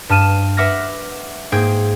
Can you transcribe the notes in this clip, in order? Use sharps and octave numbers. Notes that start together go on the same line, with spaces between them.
G2 A5 F6 D#7 E7
B4 E5 F#5 D6 F6 A#6
G#2 A#3 G#4 G5 G6 G#6